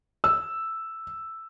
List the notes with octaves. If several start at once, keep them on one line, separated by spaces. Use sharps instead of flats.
E6